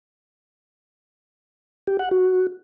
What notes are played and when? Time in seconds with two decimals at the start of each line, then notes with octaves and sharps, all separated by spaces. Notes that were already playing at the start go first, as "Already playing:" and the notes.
1.87 G4
1.99 F#5
2.11 F#4